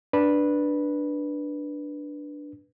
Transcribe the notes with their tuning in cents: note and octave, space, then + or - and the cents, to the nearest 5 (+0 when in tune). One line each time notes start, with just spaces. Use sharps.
D4 +0 B4 -10